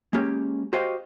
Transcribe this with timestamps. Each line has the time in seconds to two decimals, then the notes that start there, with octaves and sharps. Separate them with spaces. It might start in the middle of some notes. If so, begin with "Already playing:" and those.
0.13 G#3 A#3 C#4 G4
0.73 F#4 G4 C5 D#5 F5 G5